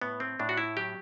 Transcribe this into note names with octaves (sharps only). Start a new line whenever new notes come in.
A2 B3
C4
A2 D4
F#4
E4
F#3 G4